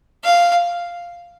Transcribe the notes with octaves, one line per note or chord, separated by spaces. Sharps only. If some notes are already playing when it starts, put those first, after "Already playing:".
F5